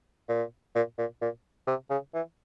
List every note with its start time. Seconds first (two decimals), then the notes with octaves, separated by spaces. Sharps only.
0.29 A#2
0.75 A#2
0.98 A#2
1.22 A#2
1.67 C3
1.90 C#3
2.14 E3